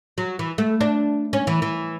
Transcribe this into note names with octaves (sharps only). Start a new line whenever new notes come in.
F#3
E3
A3
D4
C#4
E3
E3